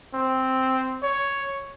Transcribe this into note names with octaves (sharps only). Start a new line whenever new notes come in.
C4
C#5